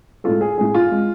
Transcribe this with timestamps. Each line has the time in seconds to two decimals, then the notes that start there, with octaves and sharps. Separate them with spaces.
0.24 A2 G#3 F4 A4
0.41 G#4
0.57 A2 G#3 G#4
0.74 F4
0.92 G#3